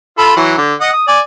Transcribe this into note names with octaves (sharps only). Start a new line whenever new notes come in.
F4 A4 B5
E3 F#3
D3
D#5 F#5
D#6
D5 G#5